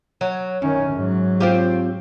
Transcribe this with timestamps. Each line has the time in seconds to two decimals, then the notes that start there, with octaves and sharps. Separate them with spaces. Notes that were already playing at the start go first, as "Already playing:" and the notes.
0.21 F#3
0.62 F#2 D#3 C#4
0.93 G#2 F#3
1.40 C4 F4 G4